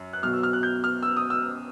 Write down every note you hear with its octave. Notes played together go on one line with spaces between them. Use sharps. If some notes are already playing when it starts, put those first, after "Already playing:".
Already playing: F#2
F#6
B1 B2 F#3 F6
E6
F6
F#6
G6
F6
E6
D#6
E6